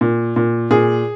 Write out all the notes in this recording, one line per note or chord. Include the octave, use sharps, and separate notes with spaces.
A#2
A#2
A#2 G#4